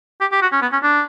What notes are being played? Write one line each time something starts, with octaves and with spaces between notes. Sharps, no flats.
G4
G4
F#4
C#4
B3
C#4
D4